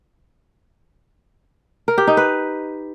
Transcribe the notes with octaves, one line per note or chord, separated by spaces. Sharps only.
A#4
G4
D#4
B4